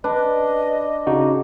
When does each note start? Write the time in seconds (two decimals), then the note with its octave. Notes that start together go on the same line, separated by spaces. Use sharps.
0.04 D4 B4 D#5
1.07 C#3 D#4 F#4